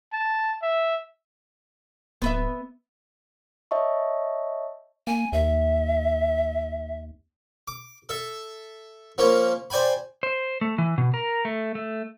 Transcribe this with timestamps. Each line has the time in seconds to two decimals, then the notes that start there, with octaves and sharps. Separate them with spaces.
0.13 A5
0.62 E5
2.22 D1 B3 B4 E5
3.71 C#5 D#5 E5 A5 C#6
5.07 A#3 G#5
5.33 D#2 E5
7.68 D6
8.09 A4 E5
9.18 F3 A#3 C#4 F4
9.70 C5 D5 G5 G#5 B5
10.23 C5
10.61 A3
10.78 E3
10.98 B2
11.14 A#4
11.45 A3
11.75 A3